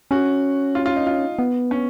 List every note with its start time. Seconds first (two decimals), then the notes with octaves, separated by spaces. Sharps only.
0.11 C#4 F#4
0.75 F4
0.86 F4
0.96 D#4
1.07 F4
1.39 B3
1.71 C#4